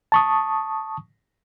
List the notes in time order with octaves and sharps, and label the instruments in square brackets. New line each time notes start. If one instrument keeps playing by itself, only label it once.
[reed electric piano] A5 C#6 D#6